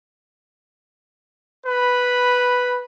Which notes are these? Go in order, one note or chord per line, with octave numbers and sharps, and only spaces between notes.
B4 B5